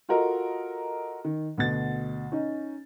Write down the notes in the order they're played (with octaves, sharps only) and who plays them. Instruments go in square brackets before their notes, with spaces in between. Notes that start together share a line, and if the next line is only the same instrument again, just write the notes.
[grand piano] F4 F#4 A4 A#4 D#5
D#3
D2 B2 A6
C#4 D#4